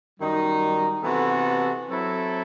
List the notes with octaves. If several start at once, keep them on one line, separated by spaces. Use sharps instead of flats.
F#2 D#3 G3 D#4
C3 E3 B3 F#4 A4
F#3 C4 E4 A4